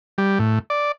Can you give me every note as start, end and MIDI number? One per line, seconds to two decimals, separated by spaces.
0.18 0.39 55
0.39 0.59 45
0.70 0.92 74